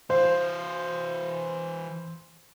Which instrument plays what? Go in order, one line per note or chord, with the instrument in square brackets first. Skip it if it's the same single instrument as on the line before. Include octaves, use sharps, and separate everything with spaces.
[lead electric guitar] E3 F5 [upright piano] C5